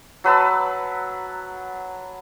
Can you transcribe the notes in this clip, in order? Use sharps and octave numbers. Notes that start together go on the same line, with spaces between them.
F#3 B4 A5 E6